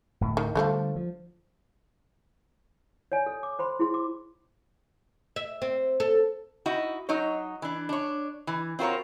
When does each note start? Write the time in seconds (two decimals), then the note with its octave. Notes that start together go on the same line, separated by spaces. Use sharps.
0.21 D1 A2
0.37 D#3
0.55 D3 F3 G3 A3 B3
0.96 F3
3.12 C#5 D5 G#5
3.26 A4
3.43 D6
3.59 C5 B5 C6
3.79 E4 G#4 C6
3.94 D6
5.36 E5
5.62 C4
6.00 A4
6.66 D#4 E4 F#4
7.09 F#3 D#4 C#5
7.62 E3 D4
7.89 D4 C#5
8.47 E3
8.79 C4 F4 F#4 A4 A#4 C#5